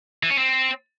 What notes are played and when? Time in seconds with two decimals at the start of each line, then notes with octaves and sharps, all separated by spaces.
0.23 E3
0.30 C#4
0.37 C4